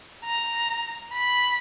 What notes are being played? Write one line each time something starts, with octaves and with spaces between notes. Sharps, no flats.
A#5
B5